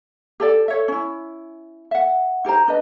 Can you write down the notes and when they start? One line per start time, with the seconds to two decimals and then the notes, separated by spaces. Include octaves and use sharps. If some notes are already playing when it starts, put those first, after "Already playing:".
0.40 G4 A4 D5
0.68 A4 C#5 E5
0.88 C#4 E4
1.91 E5 F#5
2.44 D#4 G4 C5 A#5
2.68 D4 B4 D#5